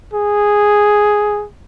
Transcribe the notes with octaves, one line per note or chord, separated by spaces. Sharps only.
G#4